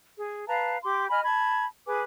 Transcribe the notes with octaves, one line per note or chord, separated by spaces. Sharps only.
G#4
B4 F5 A5 A#5
G4 C6 D6
D#5 G#5 B5 F6
A5 B5 G#6
G#4 B4 G#5 D6